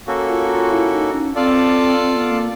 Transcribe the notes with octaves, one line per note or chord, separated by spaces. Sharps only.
A#3 C#4 F#4 A4
F4
F4
E4
D#4
C#4
C4 F4 A4 D5 F5 A5
C4
B3
A#3